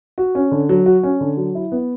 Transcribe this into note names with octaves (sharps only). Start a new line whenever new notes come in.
F#4
C#4
D3
F#3
F#4
C#4
D3
F#3
E4
B3